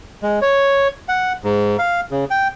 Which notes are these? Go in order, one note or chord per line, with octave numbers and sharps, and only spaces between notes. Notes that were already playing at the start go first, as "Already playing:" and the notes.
G#3
C#5
F#5
G#2
F5
C#3
G5